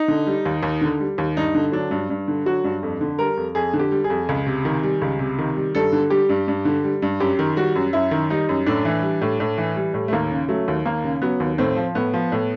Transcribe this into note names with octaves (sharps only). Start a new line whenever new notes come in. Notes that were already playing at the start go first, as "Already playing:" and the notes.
Already playing: D#4
D3
G3
D#2
D#2
D3
G3
D#2
G2 D#4
D3
F#3 D4
G2
G2
D3
F#3 F#4
G2
F2
D3
G3 A#4
F2
F2 G#4
D3
G4
G3
G#4
F2
C#2
C3
D#3
G3
C#2
C3
D#3
G3
G2 A4
D3
G3 G4
G2
G2
D3
G3
G2
F#2 G4
D#3
G3 F#4
F#2
F#2 E4
D#3
G3 D#4
F#2
A2 D4
E3
G3
A2
A2
E3
G3
A2
A3
D#2 A#3
C#3
F#3 A3
D#2
D#2 A#3
C#3
F#3 B3
D#2
A2 C4
F3
A2 B3
F3
A2